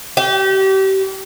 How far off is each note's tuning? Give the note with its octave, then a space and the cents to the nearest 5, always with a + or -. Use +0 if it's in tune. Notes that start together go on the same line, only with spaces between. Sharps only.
G4 -30